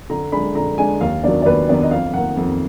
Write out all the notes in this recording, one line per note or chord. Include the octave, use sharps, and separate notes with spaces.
D3 A#5
G#3 D4 B5
D3 A#5
G#3 D4 G#5
D#2 F5
D#3 F#3 B3 D4 D5
D5
D#2 B4
D#3 F#3 B3 D4 D5
D#5
F2 F5
D#3 A#3 F#5
F2